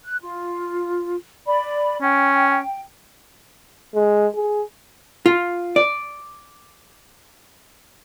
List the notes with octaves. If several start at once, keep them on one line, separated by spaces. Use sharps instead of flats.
F#6
F4
D5 B5
C#4 G5
G#3
G#4
F4
D5